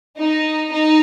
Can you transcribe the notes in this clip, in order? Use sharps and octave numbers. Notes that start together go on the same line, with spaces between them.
D#4
D#4